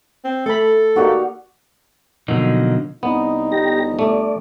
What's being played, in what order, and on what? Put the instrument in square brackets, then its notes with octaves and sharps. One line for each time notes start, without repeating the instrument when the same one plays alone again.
[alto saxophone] C4
[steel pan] A3 B5 [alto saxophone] A4
[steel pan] A#3 D#4 G4 [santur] F#4 D5 F5
[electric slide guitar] B2 D3 F3 F#3 A#3 D#4
[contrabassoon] C2 [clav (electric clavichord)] B3 [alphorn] D#4
[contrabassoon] G1 [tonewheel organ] G4 A#6
[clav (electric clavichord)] A3 [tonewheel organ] D5